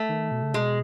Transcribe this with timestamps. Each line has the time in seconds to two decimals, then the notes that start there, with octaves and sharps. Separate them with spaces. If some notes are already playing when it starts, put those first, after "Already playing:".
Already playing: A3
0.09 D#3
0.31 B2
0.42 C#3
0.54 B2 G#3